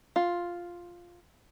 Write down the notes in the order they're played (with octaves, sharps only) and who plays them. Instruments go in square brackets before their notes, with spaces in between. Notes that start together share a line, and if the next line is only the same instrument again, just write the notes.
[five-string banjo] F4